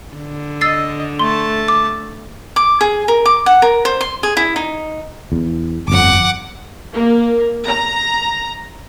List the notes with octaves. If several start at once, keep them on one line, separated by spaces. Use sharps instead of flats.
D3
D#5 E6 A6 C7
A3 A5 C6
D6
D6
G#4
A#4
D6
F#5
A#4
C5
C6
G#4
E4
D#4
E2
G1 F2 F#5 D6
A#3
A#5